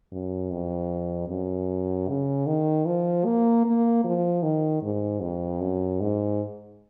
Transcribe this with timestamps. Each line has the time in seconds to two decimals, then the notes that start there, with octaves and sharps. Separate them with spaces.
0.12 F#2
0.51 F2
1.29 F#2
2.08 C#3
2.47 D#3
2.86 F3
3.25 A#3
3.65 A#3
4.04 F3
4.43 D#3
4.82 G#2
5.22 F2
5.61 F#2
6.01 G#2